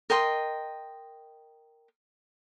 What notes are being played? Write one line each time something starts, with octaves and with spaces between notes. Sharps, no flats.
A#4 D#5 G5 C6